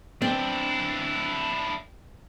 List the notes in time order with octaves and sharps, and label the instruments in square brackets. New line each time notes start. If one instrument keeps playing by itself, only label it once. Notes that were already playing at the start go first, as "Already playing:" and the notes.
[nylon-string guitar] C4 [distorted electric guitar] D4 E4